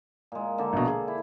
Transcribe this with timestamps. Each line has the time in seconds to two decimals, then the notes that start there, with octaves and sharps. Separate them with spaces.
0.32 A#2 G#3
0.58 D3 A#3 A4
0.73 A#1 B2
0.88 G#4
1.08 E4